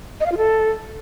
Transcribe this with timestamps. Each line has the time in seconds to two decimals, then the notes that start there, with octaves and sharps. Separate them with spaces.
0.20 D#5
0.26 F5
0.32 F4
0.37 A4